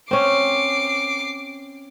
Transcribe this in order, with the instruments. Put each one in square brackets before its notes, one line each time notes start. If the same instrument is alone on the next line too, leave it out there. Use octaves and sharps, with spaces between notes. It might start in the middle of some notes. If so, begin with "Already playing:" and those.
[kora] C4 C#4 [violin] D6 C7